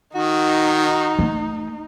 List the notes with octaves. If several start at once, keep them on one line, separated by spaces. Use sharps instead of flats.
D#3 D#4 F#4
A3